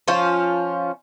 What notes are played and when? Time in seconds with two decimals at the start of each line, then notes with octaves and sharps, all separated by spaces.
0.08 F3 C#4 F4